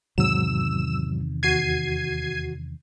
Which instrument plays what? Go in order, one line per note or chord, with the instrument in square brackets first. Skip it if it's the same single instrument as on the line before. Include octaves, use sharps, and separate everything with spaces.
[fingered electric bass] E2 C3 D#3 [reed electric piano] G#2 F#3 [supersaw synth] E6 E7
[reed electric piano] D#2 F#4 [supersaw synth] G#6 C7 D#7